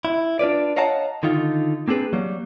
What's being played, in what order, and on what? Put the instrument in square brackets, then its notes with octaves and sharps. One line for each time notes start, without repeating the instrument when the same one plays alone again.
[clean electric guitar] E4
D4 F4 B4 D5
C#5 D#5 F5 F#5 A5 A#5
D3 D#3 D#4 F4
A#3 C4 D4 G#4 B4
F#3 G3 A#3